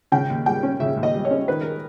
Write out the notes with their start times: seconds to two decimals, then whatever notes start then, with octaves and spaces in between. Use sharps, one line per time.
0.12 C#3 G5
0.30 D#2
0.46 G3 G5
0.63 C#4
0.80 C#3 E5
0.97 D#2
1.03 D#5
1.14 G3
1.25 C#5
1.31 C#4
1.48 D#3 B4
1.61 A#4